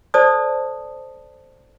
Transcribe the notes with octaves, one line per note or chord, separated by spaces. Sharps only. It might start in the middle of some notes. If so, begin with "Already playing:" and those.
A4 C5 D5 A5 D#6